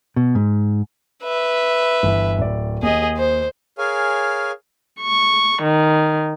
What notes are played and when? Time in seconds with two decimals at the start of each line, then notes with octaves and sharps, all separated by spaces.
0.16 B2
0.35 G#2
1.23 B4 E5
2.03 G1 E3
2.39 D1 D5
2.83 D#2 G#4 D#5
3.17 C5
3.78 G#4 A#4 C#5 F5 G#5
5.01 C#6
5.62 D#3